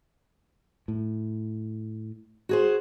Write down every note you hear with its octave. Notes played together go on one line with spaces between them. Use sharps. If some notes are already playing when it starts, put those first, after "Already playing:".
A2
F#4 G#4 C5